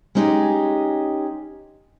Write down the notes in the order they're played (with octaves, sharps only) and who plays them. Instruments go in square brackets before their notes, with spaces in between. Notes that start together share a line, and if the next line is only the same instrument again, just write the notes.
[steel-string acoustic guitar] G#3 C#4 D#4 G4 G#4